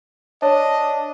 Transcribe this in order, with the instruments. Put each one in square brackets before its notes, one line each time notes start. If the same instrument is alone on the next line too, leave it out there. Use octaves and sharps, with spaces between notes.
[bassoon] D4 [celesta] C#5 [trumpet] D#5